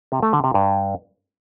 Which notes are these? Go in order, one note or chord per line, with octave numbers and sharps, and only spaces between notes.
C3
A3
D3
C3
G2